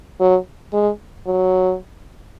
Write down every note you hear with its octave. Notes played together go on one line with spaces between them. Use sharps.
F#3
G#3
F#3